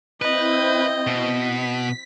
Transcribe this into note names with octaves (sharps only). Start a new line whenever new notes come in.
C4 E4 B4 D#5 G6
B2 B6